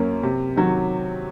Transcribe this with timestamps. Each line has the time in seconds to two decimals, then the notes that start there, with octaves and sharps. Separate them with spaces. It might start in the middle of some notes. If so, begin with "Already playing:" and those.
Already playing: F#2 A#3 C#4
0.23 C3
0.56 D#3 F#3